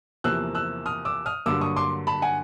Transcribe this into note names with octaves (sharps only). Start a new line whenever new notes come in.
E2 C3 F3 A#3 E6 F#6
E6 F#6
D#6 F6
D6 E6
D#6 F6
G2 D3 F#3 A#3 D6 E6
C#6 D#6
C6 D6
A5 B5
F#5 G#5